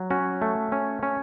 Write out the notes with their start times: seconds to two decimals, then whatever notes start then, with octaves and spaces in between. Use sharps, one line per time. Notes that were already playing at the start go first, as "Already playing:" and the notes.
Already playing: F#3
0.11 C#4 F#4
0.42 A3
0.72 C#4
1.03 C#4